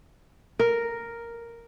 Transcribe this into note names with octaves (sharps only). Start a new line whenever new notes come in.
A#4